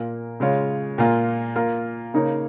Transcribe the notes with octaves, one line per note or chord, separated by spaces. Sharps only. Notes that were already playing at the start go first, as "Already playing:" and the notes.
Already playing: A#2 A#3 F4 A#4
C#3 G#3 F4 C#5
A#2 A#3 F4
A#3 F4 A#4
C#3 A#3 D#4 A#4 C#5